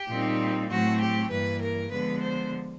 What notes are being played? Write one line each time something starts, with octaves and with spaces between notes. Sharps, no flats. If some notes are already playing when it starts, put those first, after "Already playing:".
Already playing: G4
A#2 G3 C4 D#4
A2 F#3 A3 C4 F#4
G4
G2 E3 G3 A#3 B4
A#4
D3 F3 G#3 B3 B4
C5